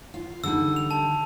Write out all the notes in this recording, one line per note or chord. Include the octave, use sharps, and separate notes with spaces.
F4
D3 G3 D#4 E6
F7
A5